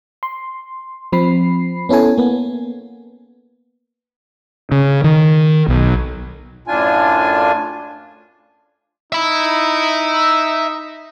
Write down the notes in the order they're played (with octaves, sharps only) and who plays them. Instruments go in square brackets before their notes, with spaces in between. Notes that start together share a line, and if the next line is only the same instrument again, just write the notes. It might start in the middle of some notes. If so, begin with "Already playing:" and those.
[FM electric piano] C6
F3 C4 B5 C7
B3 C#4 E4 A4 G#5
A#3 B3
[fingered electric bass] C#3
D#3
B1
[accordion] F#2 A2 D4 F4 G#5
[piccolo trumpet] D#4 [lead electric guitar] E5 B5